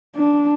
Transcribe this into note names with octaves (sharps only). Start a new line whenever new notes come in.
D4